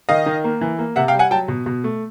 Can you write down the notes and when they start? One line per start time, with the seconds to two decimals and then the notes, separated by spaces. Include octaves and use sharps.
0.09 D#3 D#5 F5
0.26 D#3
0.44 A#3
0.61 E3
0.79 A#3
0.96 C3 E5 F#5
1.08 F5 G5
1.14 G3
1.19 F#5 G#5
1.31 F#3 G5 A5
1.48 B2
1.66 B2
1.84 A3